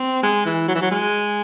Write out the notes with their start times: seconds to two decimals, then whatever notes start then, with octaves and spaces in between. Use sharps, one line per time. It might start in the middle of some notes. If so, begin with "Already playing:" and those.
Already playing: C4
0.23 G#3
0.46 E3
0.68 F#3
0.75 E3
0.82 F#3
0.91 G#3